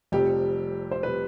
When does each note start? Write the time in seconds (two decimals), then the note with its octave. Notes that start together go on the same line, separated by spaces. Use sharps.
0.12 F1 F2 C3 G3 G4
0.91 C5
1.03 C3 G3 B4